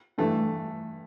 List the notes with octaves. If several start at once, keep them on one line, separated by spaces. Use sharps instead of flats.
G2 E3 A3